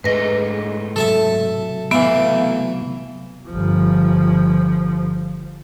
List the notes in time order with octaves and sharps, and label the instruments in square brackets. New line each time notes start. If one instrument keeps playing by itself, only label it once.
[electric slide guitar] G#2 A3 D#5 [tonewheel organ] G#4 [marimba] B4 A#6
[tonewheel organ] C3 F#3 [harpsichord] A4 E5 A5
[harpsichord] E3 E5 [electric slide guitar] A3 F5 [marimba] B3
[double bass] G1 F3